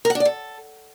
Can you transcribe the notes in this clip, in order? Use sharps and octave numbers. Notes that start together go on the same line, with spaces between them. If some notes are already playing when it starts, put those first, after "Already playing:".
A#4
F#5
D4
D5
A4